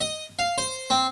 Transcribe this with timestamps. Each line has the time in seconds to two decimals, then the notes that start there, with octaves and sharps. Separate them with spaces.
0.01 D#5
0.39 F5
0.58 C5
0.90 C4